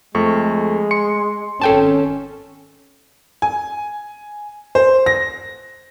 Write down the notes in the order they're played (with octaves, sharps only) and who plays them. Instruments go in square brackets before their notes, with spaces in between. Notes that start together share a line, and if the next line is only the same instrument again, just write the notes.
[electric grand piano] F2 A3 C#6 [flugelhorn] G#3
[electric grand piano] C6 C#7
[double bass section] G#1 C#4 [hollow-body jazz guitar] A4 G5 A5
[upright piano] G#5
C5
A#6